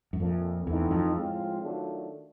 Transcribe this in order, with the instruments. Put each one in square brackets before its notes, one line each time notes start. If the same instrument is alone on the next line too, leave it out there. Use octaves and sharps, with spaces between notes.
[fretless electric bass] F#2
[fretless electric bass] F2 [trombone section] A#2 F3 A3
[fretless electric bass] E2 [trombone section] E3 A3 C4 D#4
[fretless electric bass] F2
[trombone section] A2 F3 G#3 C4 F4
D#3 F#3 A3 D4 F4